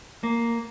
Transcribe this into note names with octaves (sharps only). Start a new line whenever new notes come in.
A#3